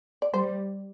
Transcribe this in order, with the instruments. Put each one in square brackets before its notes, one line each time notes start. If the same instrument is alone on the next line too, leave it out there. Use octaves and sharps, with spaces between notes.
[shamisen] D5
[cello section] G3 [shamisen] C5